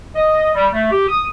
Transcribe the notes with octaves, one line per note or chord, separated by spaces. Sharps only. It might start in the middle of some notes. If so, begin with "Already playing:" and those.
D#5
G3
A3
G4
D#6